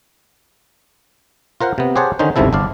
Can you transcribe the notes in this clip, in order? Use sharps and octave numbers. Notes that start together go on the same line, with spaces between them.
F4 A#4 C5 F#5
C3 B3
G4 G#4 C5 C#5 F#5 A5
D3 D#3 C#4 D#4 C5
G1 C#2 G#2 C3 E4 A4
G1 D4 D5 F5